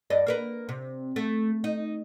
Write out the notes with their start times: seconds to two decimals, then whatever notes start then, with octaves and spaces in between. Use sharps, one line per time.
0.10 G2 D5 D#5
0.27 A#3 A#4 B4
0.69 C3
1.16 A3
1.64 D#4